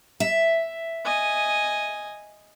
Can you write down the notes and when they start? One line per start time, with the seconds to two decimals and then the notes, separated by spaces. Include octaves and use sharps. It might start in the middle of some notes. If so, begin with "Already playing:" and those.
0.20 E5
1.05 D#5 G#5